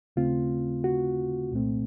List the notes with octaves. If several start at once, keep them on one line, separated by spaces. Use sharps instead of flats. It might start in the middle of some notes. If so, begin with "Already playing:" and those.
D#2 C#3 A3 C4 F4
F#4
C2 A#2 A3 C4